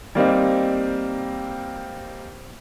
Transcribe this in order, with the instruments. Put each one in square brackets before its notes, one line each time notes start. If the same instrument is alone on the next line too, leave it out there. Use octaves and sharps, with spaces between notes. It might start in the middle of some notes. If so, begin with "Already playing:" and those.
[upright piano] G3 A#3 C4 D#4